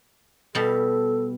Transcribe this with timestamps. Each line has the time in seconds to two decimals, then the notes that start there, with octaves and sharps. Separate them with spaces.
0.55 B2 G3 A4